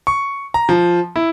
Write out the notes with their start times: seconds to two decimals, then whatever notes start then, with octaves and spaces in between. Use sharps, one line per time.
0.07 C#6
0.54 A#5
0.69 F3
1.16 E4